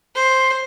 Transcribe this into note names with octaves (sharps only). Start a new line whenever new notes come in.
C5